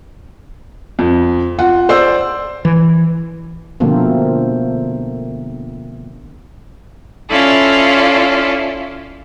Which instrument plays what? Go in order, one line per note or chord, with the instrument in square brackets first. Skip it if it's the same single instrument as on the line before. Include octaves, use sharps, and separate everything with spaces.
[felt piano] F2
F4 F#5
C5 D5 E6
[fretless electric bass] E3
[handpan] B2 D3 F3 A3 A#3 C4
[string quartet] C#4 E4 F4 A4 D5